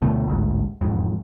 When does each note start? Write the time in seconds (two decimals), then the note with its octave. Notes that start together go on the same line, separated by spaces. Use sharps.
0.02 D2 B2 A3
0.27 A1 D2 G#2
0.81 E1 F2 G#2